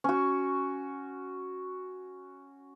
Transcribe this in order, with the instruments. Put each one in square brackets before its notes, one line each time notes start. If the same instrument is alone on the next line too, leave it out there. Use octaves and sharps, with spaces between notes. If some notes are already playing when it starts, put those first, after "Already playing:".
[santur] C#4 F#4